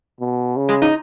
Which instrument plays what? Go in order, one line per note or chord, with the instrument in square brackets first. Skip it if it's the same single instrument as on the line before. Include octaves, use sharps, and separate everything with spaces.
[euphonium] B2
C#3
[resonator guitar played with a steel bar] G#3
D#4